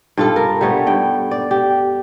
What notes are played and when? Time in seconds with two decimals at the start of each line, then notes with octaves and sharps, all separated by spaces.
0.17 G2 F4 A4
0.36 A#4
0.61 G3 A3 B3 C#5
0.87 G2 G5
1.31 D5
1.51 G4